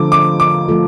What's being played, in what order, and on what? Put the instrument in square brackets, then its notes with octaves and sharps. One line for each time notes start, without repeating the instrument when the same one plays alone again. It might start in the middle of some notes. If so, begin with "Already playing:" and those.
Already playing: [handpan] D3 F3 A3 F4 A4 [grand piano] D6
[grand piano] D6
D6
[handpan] F3 A3 F4 A4